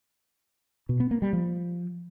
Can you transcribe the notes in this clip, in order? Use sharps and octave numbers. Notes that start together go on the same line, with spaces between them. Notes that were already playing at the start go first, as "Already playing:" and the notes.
B2
B3
A#3
G3
F3